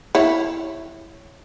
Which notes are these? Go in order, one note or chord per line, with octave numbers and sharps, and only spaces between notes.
E4 C#5